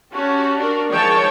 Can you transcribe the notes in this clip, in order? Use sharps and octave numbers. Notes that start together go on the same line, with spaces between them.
C#4 F#4 G4 A5
D4 F#4 A#4
D#3 F3 G#3 C#5 G5 A5